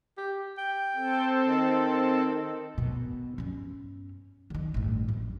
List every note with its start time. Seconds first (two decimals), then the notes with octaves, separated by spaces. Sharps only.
0.17 G4
0.57 G5
0.96 C4 A4
1.48 D#3
2.78 B2
3.38 G2 C#4
4.50 D3 D#3
4.74 A1 G2
5.08 F#2